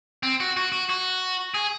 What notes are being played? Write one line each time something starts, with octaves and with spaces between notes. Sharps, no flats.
C4
F#4
F#4
F#4
F#4
G#4